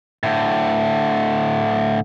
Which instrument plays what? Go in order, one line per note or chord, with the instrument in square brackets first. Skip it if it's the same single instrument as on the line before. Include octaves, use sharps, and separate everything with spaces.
[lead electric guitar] A2 D3